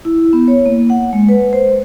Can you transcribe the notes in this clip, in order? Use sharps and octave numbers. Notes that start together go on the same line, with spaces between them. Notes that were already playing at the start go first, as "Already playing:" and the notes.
E4
B3
C#5
A#3
F#5
G#3
B4
C5